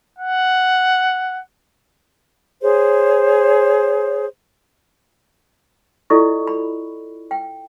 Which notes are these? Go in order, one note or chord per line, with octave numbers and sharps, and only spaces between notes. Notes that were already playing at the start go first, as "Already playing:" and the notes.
F#5
G#4 C5 C#5
E4 F4 A4 D5 D#5 C#6
B5
G5